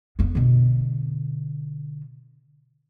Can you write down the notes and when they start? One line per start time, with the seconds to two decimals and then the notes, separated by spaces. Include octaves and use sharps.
0.19 F2 B3
0.35 B2 D3